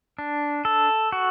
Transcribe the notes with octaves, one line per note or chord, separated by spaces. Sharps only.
D4
A4
F#4